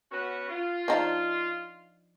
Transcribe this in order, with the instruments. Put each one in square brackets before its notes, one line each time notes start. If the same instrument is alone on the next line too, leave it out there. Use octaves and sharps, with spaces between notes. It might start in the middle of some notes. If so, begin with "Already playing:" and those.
[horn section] B3 C#4 F#4
F4
[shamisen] F3 D4 D#4